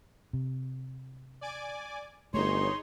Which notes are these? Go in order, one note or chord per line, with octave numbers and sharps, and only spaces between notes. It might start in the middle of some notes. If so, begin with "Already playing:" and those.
C3
D5 G#5 D6
G1 A3 D#4 G#4 C#5 C6